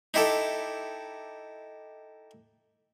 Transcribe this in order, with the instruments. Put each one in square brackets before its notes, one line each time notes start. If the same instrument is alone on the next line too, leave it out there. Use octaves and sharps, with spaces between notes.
[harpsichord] D#4 E4 G4 A4